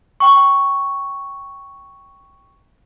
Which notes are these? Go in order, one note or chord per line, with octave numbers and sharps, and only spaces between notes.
G5 C#6